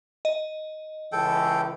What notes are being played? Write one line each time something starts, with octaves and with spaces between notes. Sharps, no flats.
D#5
C#2 E3 A4 G5